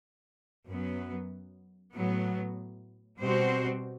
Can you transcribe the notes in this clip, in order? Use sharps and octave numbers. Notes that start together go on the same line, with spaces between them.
F#2 F#3 B3
A2 F#3 B3
B2 G3 C4 F#4 C5